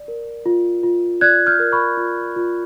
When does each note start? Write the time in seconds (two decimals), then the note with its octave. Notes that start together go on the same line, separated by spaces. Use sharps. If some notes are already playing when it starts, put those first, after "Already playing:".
Already playing: D5
0.08 A#4
0.46 F4
0.83 F4
1.21 D5 F#6 G#6
1.47 F6 G6
1.59 A#4
1.72 B5 C#6
1.98 F4
2.36 F4